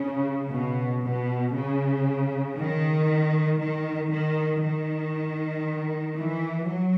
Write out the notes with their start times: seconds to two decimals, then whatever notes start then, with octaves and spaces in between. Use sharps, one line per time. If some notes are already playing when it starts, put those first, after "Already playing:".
Already playing: C#3
0.51 B2
1.03 B2
1.54 C#3
2.56 D#3
3.59 D#3
4.10 D#3
4.62 D#3
6.17 E3
6.68 F#3